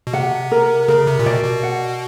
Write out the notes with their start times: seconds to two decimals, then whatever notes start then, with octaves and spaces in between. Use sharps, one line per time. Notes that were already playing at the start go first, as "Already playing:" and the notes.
0.07 B2
0.13 C3 F#5
0.52 A#4
0.88 C#3 A#4
1.07 C3
1.19 A#2
1.26 B2 D5
1.44 B2
1.63 F#5